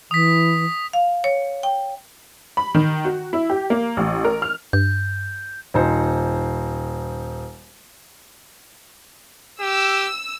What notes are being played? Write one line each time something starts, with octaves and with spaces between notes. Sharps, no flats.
E3 D#6 B6
F5
C#5
G5
B5
D#3
F#4
E4
G4
A#3
A1
A#4
F6
G2 G6
D#1 D#4 C5
G4 E6